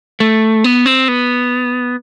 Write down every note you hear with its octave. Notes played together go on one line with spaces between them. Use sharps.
A3
B3
C4
B3